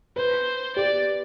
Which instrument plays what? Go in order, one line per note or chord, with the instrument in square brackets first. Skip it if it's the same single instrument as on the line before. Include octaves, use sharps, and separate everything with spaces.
[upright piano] B4 [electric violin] C5
[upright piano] G4 [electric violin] D5